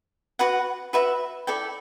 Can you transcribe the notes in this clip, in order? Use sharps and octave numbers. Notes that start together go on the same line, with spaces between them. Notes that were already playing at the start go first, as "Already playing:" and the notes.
F#4 B4 F#5
F#4 B4 E5
E4 A4 D5 G5